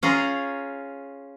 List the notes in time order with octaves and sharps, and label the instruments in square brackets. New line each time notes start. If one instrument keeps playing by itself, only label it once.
[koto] C#4 F4 G#4 A#5